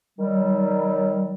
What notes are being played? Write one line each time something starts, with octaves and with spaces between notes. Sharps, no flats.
D#3 F#3 G3